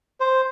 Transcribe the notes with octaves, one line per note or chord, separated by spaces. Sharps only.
C5